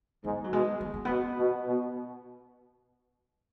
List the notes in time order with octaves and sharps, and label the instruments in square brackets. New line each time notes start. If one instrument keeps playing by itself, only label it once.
[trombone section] G#2 [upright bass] B3
[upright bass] F#3
[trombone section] B2 [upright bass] G#3
[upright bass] B3
G#3
[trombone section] B2 [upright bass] B3
[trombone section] B2
B2